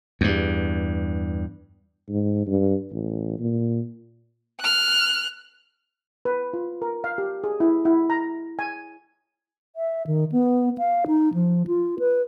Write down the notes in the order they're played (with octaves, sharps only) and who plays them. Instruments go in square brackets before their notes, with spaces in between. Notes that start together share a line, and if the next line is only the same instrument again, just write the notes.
[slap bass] E2 G2
[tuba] G#2
G2
A1
A#2
[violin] F6 F#6
[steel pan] B4
F4
A#4
F5
G4
G#4
E4
E4
A#5
G#5
[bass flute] E5
D#3
B3
F5
D#4
F3
F4
B4